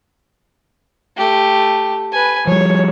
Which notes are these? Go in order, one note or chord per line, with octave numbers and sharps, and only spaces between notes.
A3 G4
B4 G#5
F3 G3 C#5